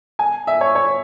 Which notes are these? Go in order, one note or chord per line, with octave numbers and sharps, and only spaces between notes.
G#5
E5
C#5
C#5